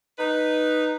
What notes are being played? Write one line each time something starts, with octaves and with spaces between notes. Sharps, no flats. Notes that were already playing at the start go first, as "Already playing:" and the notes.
D#4 B4